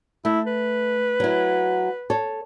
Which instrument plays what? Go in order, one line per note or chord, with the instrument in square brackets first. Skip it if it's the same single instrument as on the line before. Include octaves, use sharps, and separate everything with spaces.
[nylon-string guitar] A3 [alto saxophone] E4
[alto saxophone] B4
[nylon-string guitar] F#3 E4
A4 C#5